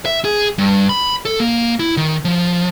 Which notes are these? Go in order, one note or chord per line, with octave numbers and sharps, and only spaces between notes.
E5
G#4
G2
B5
A4
A#3
E4
D#3
F3